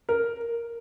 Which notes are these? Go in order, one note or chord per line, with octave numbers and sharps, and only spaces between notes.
A#4